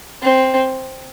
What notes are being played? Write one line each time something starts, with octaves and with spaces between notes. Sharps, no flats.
C4